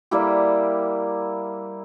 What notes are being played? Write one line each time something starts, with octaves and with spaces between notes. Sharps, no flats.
G3 A#3 E4 G4